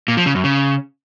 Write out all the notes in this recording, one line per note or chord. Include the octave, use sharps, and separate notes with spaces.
A#2
F3
C#3
F#2
C#3